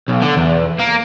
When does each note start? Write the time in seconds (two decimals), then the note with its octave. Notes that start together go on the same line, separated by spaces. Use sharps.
0.08 B1
0.22 D3
0.37 E2
0.80 A#3